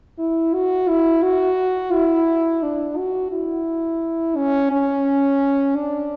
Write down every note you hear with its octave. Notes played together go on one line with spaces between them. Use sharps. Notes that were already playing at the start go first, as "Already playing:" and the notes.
E4
F#4
E4
F#4
E4
D4
F#4
E4
C#4
C#4
D4